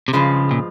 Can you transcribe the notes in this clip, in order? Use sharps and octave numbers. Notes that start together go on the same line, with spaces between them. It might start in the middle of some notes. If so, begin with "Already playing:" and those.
C3
G2 C#3 F3 G#3
A#2